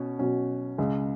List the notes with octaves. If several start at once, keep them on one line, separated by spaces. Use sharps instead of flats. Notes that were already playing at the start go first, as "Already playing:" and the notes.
Already playing: B2 C#4
B2 F#3 C#4
C#2 C#3 G#3